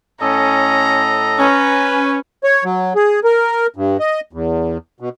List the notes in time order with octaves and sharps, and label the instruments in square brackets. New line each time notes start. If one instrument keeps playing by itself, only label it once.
[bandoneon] A2 A4 D#5 [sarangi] C#4 [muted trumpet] A#5
[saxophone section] C#4 [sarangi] B4
[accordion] C#5
F#3
G#4
A#4
G2
D#5
E2
B2